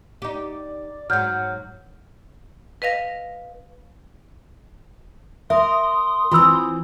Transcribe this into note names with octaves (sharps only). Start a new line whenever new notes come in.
D#4 G4 D5
G#2 F#3 F#5 F6 G6
B4 D#5 F5 A#6
A#4 E5 C6 D#6
E3 C4 F4 B5 E6